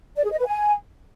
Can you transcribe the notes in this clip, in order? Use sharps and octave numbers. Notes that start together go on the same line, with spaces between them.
D5
G#4
D#5
B4
G#5